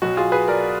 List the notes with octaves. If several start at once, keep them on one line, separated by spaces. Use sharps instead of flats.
B1 B2 F#3 F#4
F4 G#4
G#4 B4
A#4 D5